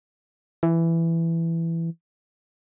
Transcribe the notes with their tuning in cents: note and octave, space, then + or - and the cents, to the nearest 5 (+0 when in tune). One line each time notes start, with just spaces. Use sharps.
E3 +10